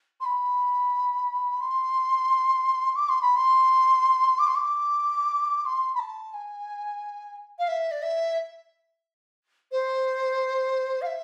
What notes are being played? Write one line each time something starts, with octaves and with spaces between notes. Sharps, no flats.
C6
B5
C6
D6
C6
B5
C6
D6
C6
D6
C6
B5
A5
G#5
F5
E5
D5
E5
C5
F5
E5